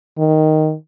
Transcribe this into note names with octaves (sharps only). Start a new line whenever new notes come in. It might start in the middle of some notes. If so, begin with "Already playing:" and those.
D#3